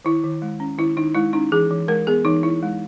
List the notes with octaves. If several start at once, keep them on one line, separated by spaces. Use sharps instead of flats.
D#3 E4
D#3
G#3
C#4
D#3 E4
D#3 D#4
G#3 E4
C#4 D#4
E3 G#4
E3
G#3 A#4
B3 G#4
E3 D#4
E3 E4
G#3